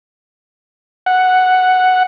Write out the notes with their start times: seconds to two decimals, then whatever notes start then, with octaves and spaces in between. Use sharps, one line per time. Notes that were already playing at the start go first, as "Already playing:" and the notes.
1.06 F#5